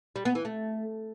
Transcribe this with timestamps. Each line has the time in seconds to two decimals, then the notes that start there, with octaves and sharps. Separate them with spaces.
0.16 G3
0.25 B3
0.35 E3
0.45 A3